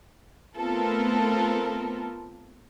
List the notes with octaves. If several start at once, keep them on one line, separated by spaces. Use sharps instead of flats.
A3 B3 C4 F4 A4 A#4